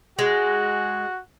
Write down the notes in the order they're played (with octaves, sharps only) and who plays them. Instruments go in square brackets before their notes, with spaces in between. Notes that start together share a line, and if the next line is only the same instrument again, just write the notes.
[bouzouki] G#3 [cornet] F#4